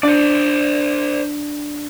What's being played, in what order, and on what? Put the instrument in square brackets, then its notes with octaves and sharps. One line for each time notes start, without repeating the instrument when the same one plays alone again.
[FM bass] D4 [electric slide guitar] C5 D5